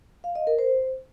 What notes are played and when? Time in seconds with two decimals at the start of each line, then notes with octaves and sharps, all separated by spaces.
0.24 F5
0.35 D#5
0.47 A#4
0.59 C5